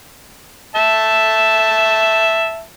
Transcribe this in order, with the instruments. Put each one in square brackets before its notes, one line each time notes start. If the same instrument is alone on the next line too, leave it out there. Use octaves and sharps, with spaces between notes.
[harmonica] E5 A5